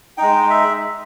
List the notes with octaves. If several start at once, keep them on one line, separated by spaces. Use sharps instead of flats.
G#3 D#4 G5
E5